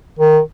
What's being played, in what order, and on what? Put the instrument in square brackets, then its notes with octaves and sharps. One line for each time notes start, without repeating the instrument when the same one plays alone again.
[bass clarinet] D#3